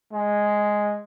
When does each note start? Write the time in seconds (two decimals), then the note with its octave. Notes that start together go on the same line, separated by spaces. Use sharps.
0.13 G#3